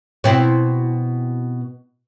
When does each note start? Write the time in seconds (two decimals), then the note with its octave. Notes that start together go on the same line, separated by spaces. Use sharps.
0.24 B2 C4 E4